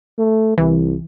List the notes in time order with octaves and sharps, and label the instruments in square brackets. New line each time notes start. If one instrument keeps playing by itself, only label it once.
[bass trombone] A3
[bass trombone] C2 [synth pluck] E3